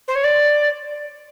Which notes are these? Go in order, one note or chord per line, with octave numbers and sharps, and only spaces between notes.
C5
C#5
D5